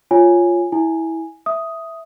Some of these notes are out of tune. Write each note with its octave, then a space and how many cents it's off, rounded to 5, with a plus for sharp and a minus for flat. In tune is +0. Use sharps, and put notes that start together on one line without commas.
F4 +0 C#5 +0 G#5 +0
E4 -15 G#5 +0
E5 +0 D#6 +5